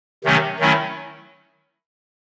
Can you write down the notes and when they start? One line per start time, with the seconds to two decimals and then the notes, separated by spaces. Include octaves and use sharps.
0.24 C3 D#3 F#3 A3 C#4
0.60 D#3 F#3 A3 C#4 E4